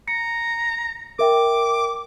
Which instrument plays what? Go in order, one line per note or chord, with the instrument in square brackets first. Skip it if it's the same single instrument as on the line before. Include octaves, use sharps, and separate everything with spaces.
[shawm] A#5 [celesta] C#7
[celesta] A#4 E5 G5 [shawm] D6